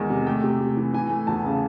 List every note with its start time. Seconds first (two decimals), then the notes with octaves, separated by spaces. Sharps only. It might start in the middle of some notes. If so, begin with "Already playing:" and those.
Already playing: E2 D#3 G#3
0.10 C3
0.27 A3 G5
0.44 C3
0.60 C3
0.77 E3
0.93 E3 G#5
1.10 A3
1.27 E2 A5
1.45 C#3